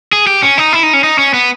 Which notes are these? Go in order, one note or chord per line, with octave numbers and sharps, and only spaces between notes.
G#4
G4
C#4
D#4
E4
D#4
C#4
D#4
C#4
B3